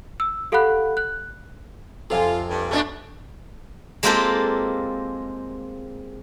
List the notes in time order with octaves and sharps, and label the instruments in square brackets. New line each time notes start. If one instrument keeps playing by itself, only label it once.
[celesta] E6
G4 A4 F5 F#5 B5 F#6
F#6
[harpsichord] F2 C3 [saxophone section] F4 [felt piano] A4 F5 G#5
[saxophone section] G2
[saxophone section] B2 [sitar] A3 C#4 D4
[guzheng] G#3 A#3 C4 F4 G4 A4